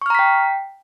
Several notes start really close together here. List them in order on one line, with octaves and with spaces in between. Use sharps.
C#6 F6 A#5 B6 G5